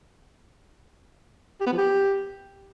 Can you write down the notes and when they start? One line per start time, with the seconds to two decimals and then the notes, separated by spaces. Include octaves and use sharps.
1.60 G4
1.66 B3
1.72 F3
1.78 G4